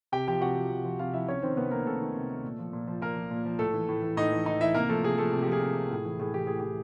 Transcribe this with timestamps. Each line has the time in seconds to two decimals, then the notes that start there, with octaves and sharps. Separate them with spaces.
0.12 C3 G4 G5
0.28 F3 G4 G5
0.41 C3 F#4 F#5
0.57 F3
0.71 C3
0.85 F3
0.99 C3 F4 F5
1.13 F3 E4 E5
1.28 C3 C#4 C#5
1.42 D#3 C4 C5
1.57 C3 B3 B4
1.71 D#3 A#3 A#4
1.86 C3 A3 A4
2.01 D#3
2.15 C3
2.29 D#3
2.43 A#2
2.59 F3
2.73 A#2
2.88 F3
3.02 A#2 A#3 A#4
3.16 F3
3.31 A#2
3.45 F3
3.59 A2 A3 A4
3.74 E3
3.89 A2
4.02 E3
4.17 A2 D#4 D#5
4.32 E3
4.46 A2 D#4 D#5
4.61 E3 E4 E5
4.74 C3 A#3 A#4
4.89 F3 A3 A4
5.03 C3 G#4
5.18 F3 A3 A4
5.33 C3
5.43 G4
5.48 F3 G#4
5.62 C3
5.77 F3
5.91 A2
6.05 E3
6.19 A2 G#4
6.34 E3 G4
6.47 A2 G#4
6.60 E3 G4